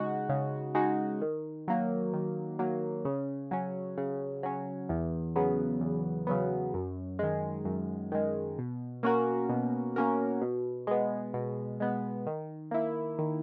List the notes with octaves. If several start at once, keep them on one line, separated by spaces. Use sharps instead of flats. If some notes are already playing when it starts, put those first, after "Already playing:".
Already playing: C#3 G#3 D#4 F#4
C#3
G#3 D#4 F#4
D#3
F#3 A#3
D#3
F#3 A#3
C#3
F#3 C#4
C#3
F#3 C#4
E2
C#3 F#3 B3
E2
C#3 F#3 B3
F#2
D#3 G#3
F#2
D#3 G#3
B2
A#3 C#4 F#4 A#4
B2
A#3 C#4 F#4 A#4
B2
G#3 B3
B2
G#3 B3
D#3
A#3 E4
D#3